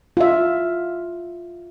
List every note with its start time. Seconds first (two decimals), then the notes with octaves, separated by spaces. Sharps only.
0.17 F4 E5